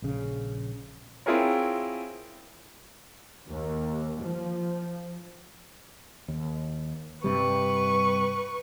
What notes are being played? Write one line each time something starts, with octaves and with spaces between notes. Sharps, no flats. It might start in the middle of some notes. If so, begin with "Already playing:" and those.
A#1 C#3
C4 E4 F4 G#4 A#4 C#5
D#2
F3
D#2
G2 C3 G3 B4 C#6